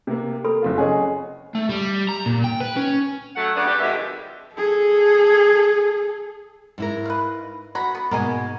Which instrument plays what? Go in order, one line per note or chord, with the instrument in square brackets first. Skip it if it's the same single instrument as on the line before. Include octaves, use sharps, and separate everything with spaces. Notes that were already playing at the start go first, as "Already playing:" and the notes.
[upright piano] C3 A#3
[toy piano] A4 B5 [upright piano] A#4
[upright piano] F#1 C4 F4
[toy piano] C#4 D#5 [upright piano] G#4 C#5
[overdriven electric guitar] A3
G3
A#5
A#2
G5
B4
C#4
[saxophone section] F#3 A3 F#5
C#3 A3 B3 D4
G3 G4
F2 G#2 B2 D#3 G#3 E5
[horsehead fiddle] G#4 A4
[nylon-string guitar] G#2 E4 A#4
[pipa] B4 F5
[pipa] F#3 A#5 B5 [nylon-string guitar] F#4
[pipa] B3
[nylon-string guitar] G#2 B2 A#3 [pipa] A#4 D#5 G#5